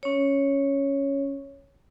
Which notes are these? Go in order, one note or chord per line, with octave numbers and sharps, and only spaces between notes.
C#4 C#5